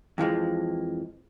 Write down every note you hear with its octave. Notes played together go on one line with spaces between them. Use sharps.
F2 E3 F3 G#3